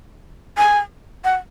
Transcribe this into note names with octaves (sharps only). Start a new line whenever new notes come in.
G#5
F#5